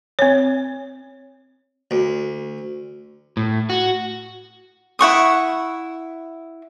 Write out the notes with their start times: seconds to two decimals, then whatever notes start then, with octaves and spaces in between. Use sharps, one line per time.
0.19 C4 C#5
1.91 D2
3.37 A2
3.70 F#4
4.99 E4 F#5 C#6 D#6